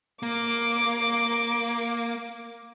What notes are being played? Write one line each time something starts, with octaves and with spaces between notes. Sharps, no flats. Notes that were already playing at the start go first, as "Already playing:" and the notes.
A#3 D6